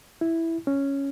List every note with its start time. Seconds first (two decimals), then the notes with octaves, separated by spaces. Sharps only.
0.21 E4
0.67 C#4